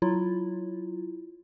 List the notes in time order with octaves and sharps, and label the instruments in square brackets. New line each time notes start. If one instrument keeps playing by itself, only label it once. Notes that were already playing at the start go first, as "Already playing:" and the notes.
[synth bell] F#3 E4 F4